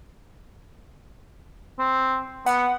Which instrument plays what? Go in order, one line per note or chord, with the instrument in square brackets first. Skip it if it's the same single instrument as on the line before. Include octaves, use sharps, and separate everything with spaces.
[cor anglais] C4
[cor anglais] B3 [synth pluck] F#5